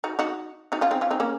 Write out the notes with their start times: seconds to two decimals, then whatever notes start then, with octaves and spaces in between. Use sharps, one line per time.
0.04 D#4 F#4
0.19 D#4 F#4
0.72 D#4 F#4
0.81 C#4 F4
0.91 C4 D#4
1.01 C#4 F4
1.11 C4 D#4
1.20 A#3 C#4